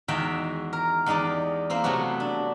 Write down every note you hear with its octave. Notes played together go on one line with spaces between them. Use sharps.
E2 D#3 G#3 F#4 E5 G5
A#4
E2 G#3 D#4 G4 D5
A#3 C4 E4 C5
C3 F#3 A3 B3 F#4
D4